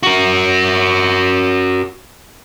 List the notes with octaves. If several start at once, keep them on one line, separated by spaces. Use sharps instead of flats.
F#4 A#4